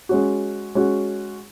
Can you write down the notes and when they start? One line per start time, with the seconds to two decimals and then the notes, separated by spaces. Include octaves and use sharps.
0.09 G#3 C#4 F#4
0.75 G#3 C#4 F#4